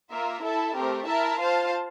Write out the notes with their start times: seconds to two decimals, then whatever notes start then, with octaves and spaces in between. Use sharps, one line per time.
0.11 A#3 F4 A#4 E5
0.43 E4 A4 E5 A5
0.75 A3 C4 G4 A#4
1.07 E4 A#4 E5 A5
1.40 F4 C5 F5 A5